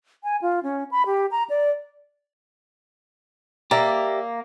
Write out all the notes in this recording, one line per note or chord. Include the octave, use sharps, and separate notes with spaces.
G#5
F4
C#4
B5
G4
A#5
D5
A#3 G4 D5 E5